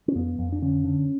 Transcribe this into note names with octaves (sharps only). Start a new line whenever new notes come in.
C#4
F2 B3
F2
D4
D3 C#4
D3